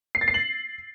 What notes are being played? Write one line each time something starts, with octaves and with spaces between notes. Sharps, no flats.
C7
A6
C7
F#7